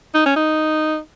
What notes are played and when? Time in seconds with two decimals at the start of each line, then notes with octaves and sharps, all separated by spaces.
0.14 D#4
0.26 C#4
0.36 D#4